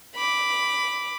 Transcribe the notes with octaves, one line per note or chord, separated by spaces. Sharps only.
B5 D6